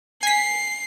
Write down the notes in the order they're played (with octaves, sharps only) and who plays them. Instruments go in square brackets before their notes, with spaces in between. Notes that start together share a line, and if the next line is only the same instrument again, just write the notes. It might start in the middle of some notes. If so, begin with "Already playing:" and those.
[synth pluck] G#5 B6 [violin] C7